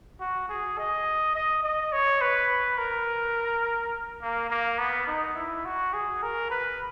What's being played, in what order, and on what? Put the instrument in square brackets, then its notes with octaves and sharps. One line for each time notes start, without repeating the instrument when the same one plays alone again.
[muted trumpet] F#4
G#4
D#5
D#5
D#5
C#5
B4
A#4
A#3
A#3
B3
D#4
E4
F#4
G#4
A#4
B4